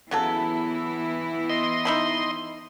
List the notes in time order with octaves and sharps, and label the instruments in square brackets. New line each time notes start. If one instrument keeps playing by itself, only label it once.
[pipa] C#3 F#3 A4 [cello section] E3 B3 E4
[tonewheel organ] D#5 C6
[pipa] D#4 E5 B5